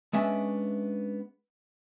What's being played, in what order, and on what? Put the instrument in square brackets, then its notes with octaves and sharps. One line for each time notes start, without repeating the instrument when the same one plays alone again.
[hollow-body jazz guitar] G#3 B3 C#4 D4 E5